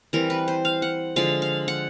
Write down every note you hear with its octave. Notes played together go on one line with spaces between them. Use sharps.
E3 G3 C4 A#4
B4
C5
F5
F#5
D3 F3 G#3 F5
F5
F#5